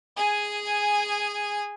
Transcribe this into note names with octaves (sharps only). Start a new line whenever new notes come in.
G#4 G#5